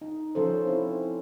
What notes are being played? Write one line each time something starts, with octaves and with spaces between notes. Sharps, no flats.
D#4
F3 C#4 A4 C5
C4 E4